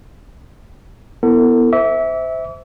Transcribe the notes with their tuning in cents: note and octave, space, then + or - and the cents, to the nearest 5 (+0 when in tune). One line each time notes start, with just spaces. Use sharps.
B3 +0 E4 +0 A4 +40
C5 -20 E5 -20 D6 -45